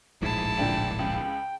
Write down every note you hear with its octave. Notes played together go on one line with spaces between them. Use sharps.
D1 A#1 G#2 E4 A5
A#2 D3 D4 G5
C#2 G5